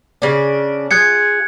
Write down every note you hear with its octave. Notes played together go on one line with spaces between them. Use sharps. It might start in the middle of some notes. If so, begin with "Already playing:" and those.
C#3 D4
F4 G#4 F#6 G#6 C#7